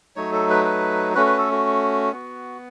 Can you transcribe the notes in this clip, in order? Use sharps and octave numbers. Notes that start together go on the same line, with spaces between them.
F#3 A3 D#4 C#5
A4
B4
B4
A3 C#4 F#4 B4
B4
A4
F#4
B3 F#4